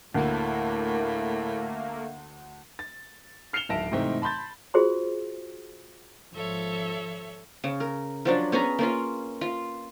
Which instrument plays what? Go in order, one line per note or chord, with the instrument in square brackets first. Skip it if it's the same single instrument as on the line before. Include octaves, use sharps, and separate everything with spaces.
[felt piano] D2 [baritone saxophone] A2 [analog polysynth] A3 A#3 [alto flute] A#4
[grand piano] A6
F6 C7 C#7 E7 F7 G7
D1 G#1 E5 A5 A#6 D7
G#2 C3 E3 A3 C4 D#4
A5 B5 C6 G6 A6
[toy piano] F4 F#4 G#4 C5 C6
[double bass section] G#1 F3 [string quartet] A4 C#5 E5
[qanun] C#3
A#4
F3 F#3 D4
B3 C#4 G#4 A#5
A#3 C#4 F4
F4